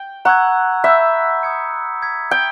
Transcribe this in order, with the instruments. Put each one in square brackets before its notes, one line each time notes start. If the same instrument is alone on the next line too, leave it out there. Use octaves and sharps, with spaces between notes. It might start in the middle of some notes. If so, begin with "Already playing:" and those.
Already playing: [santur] G5
[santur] F#5 [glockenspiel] A#5 C#6 E6 G#6
[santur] E5 [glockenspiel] B5 E6 G6
[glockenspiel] D#6 G#6 C#7
D#6 G#6 B6
[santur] G5